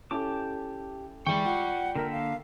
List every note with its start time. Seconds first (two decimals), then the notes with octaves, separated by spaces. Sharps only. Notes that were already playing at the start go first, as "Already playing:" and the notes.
0.11 C#4 E4 G4 A4 A5 D6
1.27 E3 G#3 D5 G5 C#6
1.45 F4 F#5
1.95 D3 A#3 A#4 E5
2.12 F5